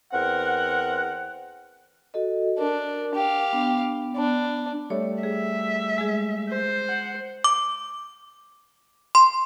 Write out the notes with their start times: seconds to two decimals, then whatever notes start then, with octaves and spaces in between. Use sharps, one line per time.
0.12 E2 C4 A#4 F#5
2.14 F#4 A4 D#5
2.58 D4 A#4
3.15 G4 F5
3.53 B3 D4
4.16 B3 D4
4.90 G3 A3 C#5
5.23 G#4 E5
5.98 G#3 G#4
6.50 C5
6.88 F#5
7.44 D6
9.15 C6